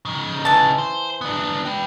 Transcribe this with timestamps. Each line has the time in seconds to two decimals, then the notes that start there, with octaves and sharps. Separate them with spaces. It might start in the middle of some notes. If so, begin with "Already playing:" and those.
0.05 C#3 D#4
0.45 E3 A5
0.78 C5
1.21 B3 D4
1.65 B4 G5